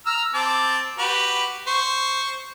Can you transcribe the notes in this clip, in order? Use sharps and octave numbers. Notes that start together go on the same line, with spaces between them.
A#5 E6 F6
C4 A5 D6
F#4 G4 B4
C5 C#6